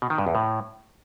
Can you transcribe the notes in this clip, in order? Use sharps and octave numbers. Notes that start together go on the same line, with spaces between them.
B2
D#3
G2
E2
A2